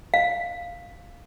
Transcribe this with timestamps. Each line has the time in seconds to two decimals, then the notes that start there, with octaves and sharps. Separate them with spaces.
0.14 F5